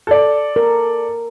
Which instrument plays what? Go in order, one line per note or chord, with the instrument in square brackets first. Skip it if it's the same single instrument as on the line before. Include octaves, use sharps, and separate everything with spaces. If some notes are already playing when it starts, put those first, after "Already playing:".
[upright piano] A4 D5
[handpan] A#4